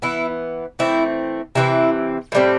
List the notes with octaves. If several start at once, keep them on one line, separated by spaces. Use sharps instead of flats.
E3 B3 E4
E3 A3 C4 E4
C3 E3 A3 C4 E4
A2 G3 C4